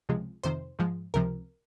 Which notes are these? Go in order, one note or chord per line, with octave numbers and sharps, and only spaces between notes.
C#2 C3 F3 G#3
F2 C3 D#3 C5
G#2 F3 G#3
C#2 C3 F3 A#4